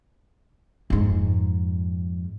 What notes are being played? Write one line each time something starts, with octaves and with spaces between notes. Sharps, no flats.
F2 G#2